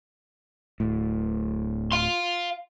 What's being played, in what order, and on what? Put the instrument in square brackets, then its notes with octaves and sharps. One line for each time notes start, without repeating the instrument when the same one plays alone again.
[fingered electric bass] D1 A2
[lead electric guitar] F5 C6